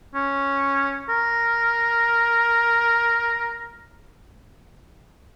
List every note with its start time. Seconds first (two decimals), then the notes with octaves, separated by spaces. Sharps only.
0.14 C#4
1.09 A#4